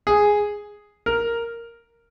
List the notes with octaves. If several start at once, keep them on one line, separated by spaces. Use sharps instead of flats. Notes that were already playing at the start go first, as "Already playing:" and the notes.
G#4
A#4